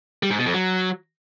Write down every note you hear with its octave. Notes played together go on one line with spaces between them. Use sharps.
G3
G#2
B2
F2
F#3